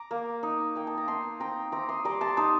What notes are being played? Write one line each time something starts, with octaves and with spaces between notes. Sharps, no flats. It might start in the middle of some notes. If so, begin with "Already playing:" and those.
Already playing: A#5 D6
A#3
D#4
A#3 G5
A5
A#5
D#4 A5 C6
C4 G5 A#5
C4 A#5 D6
C6 D#6
G3 A#5 D6
A5 C6
D#4 A5 C6